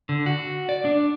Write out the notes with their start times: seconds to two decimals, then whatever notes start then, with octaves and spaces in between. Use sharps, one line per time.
0.09 D3
0.26 F#4
0.69 D5
0.85 D4